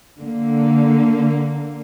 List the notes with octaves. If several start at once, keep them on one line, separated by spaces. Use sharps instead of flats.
D3 A#3